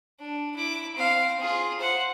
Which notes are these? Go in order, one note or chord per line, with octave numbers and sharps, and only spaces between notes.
D4
E4 D6
C4 F5
F4 G#4
C5 F#5